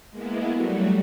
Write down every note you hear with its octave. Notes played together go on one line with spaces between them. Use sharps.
G#3 A#3 B3 E4
F#3 G3 A3 F#4